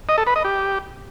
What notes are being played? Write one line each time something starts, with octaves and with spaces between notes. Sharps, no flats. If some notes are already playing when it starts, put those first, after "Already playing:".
D#5
A4
B4
D#5
G4